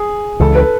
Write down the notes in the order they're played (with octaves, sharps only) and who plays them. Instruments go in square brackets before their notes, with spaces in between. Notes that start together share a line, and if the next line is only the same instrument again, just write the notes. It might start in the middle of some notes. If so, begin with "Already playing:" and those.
Already playing: [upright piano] G#4
[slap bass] C#2 C#3 E3 [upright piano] A4
[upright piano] B4